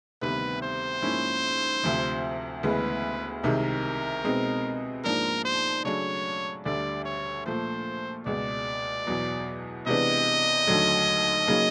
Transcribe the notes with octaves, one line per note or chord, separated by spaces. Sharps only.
D2 C3 D#3 G3 B3 B4
C5
G#2 F3 A#3 C#4 E4
D2 C3 F3
D2 C#3 E3 G#3 B3 B4
C2 C3 D#3 G#3 A#4
B2 G#3 C4 D#4
G#2 F3 A#3 D4 A#4
C5
C#3 F#3 A3 D4 C#5
D2 D3 G3 D5
C#5
A#2 F3 A3 C5
C#2 B2 G#3 D5
E2 B2 F#3
C3 E3 G#3 B3 D4 D#5
D#2 D3 F#3 A3
C#3 F#3 A#3 D#4